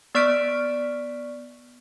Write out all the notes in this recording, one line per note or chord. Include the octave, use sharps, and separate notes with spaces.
B3 D5 C#6 F6 B6 D7